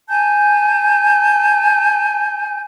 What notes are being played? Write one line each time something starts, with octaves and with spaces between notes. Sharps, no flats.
G#5 A5 G6